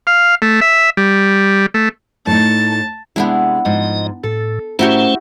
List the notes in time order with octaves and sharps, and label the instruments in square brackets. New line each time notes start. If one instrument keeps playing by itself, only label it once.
[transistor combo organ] F5
A3
E5
G3
A3
[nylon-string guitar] A2 D#4 [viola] A5
[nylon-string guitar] C3 G#3 [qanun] B3 D4 E4
[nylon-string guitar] G#2 F3 [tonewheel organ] D#5
[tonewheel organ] A2 [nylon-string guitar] A4
[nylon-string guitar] A2 A#4 [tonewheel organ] A3 C#4 C5 [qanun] E4 F#4 G4